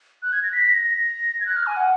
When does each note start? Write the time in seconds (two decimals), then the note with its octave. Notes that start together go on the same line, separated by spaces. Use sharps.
0.23 F#6
0.33 G#6
0.43 A#6
0.53 B6
0.69 A#6
0.84 A#6
1.40 G#6
1.46 F#6
1.56 F6
1.67 G#5
1.77 F#5